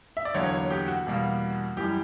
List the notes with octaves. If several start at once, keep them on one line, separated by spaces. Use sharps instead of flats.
E5
D5
E2 D3 F#3 A#3 C#5
C#5
C#5
G4
F#4
E2 B2 G3 A#3
F#2 E3 G3 G4